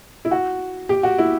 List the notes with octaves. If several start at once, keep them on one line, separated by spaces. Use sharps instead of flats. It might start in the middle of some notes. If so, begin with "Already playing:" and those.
E4
F#4
G4
F#4
E4